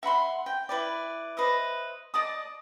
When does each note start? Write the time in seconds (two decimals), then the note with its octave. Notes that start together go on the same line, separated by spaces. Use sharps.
0.03 E5 F#5 B5 C6
0.46 G5
0.69 E4 B4 D5
1.37 B4 C5 D#5 E5
2.14 D5 D#5 A5 D#6